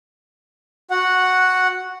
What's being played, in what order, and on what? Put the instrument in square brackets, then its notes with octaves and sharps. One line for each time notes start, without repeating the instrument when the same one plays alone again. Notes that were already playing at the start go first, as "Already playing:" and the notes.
[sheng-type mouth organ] F#4 F#5